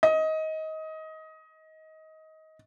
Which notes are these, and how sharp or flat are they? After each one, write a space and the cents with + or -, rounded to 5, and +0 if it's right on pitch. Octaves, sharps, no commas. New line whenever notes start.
D#5 +20